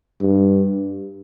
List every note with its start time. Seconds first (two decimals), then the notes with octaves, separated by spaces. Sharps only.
0.21 G2